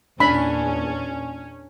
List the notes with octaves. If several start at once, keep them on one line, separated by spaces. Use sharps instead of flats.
E2 A#2 C#4 D4 B5